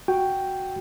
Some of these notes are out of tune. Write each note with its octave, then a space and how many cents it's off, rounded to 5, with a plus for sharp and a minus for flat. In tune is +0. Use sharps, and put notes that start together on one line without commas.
F#4 +0 G5 +0